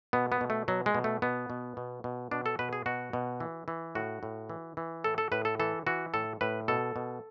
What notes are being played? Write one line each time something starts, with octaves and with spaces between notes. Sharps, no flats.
B2 B3
B3
B2
A3
B2 F#3
G#3
B2
A3
B2 B3
B2
B2
B2
B2 D4
A4
B2 B4
G#4
B2 F#4
B2
E3
E3
A2 F#4
A2
E3
E3
A2 A4
A4
A2 B4
A4
E3 A4
E3 F#4
A2 A4
A2 B4
B2 A4
B2